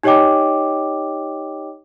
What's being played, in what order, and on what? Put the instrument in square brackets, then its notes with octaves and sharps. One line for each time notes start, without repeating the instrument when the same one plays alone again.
[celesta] D#4 G4 C#5 D#5 G5 D6